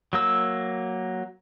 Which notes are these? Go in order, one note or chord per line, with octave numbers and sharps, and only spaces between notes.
F#3 A#3 E6